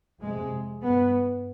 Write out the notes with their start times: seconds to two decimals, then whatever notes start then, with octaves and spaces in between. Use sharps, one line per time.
0.20 F2 C3 G#3
0.83 G2 B3